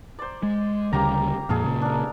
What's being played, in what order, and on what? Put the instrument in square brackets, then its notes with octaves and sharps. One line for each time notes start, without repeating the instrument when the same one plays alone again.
[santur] C5 D5
[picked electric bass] G#3
[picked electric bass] D2 C#3 G3 [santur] A#3 G4 A#5
[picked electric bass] F2 A#2 [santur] G#4 A4 F5
[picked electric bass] A#2 C#3
[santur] D4 A#4